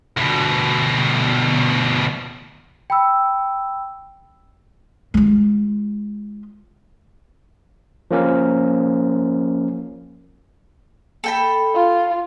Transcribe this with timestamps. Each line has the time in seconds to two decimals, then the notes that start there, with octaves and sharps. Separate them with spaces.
0.17 D2 B2
2.90 G5 B5 E6
5.14 G#3 F4
8.11 F3 A#3 C#4 A#4
11.24 A4 G5 B5
11.75 F4